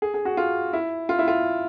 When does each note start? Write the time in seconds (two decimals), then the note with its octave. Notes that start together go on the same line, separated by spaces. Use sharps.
0.02 G#4
0.14 G#4
0.25 F#4
0.37 F4
0.73 E4
1.09 F4
1.19 E4
1.28 F4